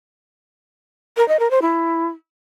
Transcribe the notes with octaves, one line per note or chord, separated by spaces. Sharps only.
A#4
D#5
A#4
C5
E4